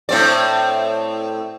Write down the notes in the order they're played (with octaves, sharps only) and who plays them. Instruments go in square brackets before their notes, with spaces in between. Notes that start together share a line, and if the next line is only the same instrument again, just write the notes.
[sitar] A2 C4 D5